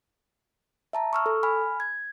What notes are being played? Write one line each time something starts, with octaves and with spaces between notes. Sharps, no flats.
E5 A5 A#5
C#6 E6 F6
A4
G#5 B5 F6
G#6